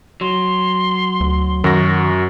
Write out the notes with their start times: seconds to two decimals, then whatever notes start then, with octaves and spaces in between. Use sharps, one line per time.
0.21 F#3 C6
1.20 D2
1.64 F#2 D#3 F#4 A#6